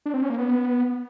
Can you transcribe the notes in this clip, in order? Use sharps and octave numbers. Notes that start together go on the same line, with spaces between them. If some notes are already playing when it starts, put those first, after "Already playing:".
D4
C4
C#4
A#3
B3